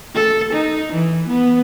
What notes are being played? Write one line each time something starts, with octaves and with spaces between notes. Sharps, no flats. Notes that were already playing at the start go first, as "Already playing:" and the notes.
A4
D#4
E3
B3